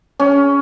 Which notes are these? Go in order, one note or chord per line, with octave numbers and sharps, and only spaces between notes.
C#4